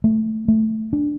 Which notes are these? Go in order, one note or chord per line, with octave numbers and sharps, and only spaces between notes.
A3
A3
D4